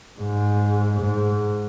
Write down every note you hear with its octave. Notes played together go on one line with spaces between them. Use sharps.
G#2
G#2